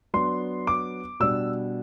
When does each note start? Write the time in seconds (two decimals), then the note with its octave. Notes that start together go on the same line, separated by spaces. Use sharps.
0.14 F#3 B3 D4 C6
0.67 D6
1.20 B2 G3 D4 E6